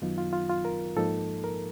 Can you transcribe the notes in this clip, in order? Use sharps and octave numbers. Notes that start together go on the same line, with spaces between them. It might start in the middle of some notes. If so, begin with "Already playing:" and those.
F#2 D#3 F#3 B3 D#4 F4
F4
F4
F4
A#4
G#2 F3 A#3 D#4 A4
A#4